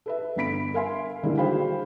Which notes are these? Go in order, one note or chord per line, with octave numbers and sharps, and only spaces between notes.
A4 B4 E5
G1 B3 B5 B6 D7
A#4 E5 F5 G#5 C6
D3 D#3 G3 G#3 A#3 E4
F#4 G#4 C5 F5 G5 B5